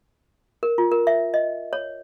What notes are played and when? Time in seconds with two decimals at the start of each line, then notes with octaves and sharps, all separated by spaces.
0.63 A#4
0.78 F4
0.92 A#4
1.07 E5
1.34 D#5
1.73 C#5